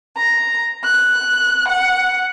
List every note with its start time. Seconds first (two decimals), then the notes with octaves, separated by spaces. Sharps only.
0.17 A#5
0.83 F#6
1.68 F#5